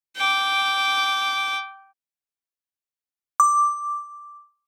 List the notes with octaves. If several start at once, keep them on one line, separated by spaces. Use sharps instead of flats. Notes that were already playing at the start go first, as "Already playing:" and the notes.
G5 D6
D6